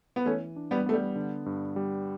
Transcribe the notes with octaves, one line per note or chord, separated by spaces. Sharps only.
B3
E3 A3 C#4
D4
G3 B3
A3 B3
G3
D3
G2
G3